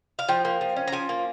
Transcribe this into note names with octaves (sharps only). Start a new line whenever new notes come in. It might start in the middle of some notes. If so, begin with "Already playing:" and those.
F5
F3 G5
A#3
F3
C#4
A#5
F3 G#5
A#3